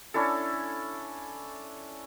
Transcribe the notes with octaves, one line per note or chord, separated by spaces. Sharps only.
C#4 D4 E4 A4